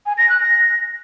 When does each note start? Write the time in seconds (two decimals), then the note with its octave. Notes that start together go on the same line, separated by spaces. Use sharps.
0.06 G#5
0.18 A#6
0.29 F#6
0.41 A#6